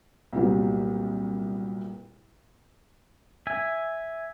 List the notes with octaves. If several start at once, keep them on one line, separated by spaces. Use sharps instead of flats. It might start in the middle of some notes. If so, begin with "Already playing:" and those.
C2 A#2 F#3 G3 B3
E5 G#5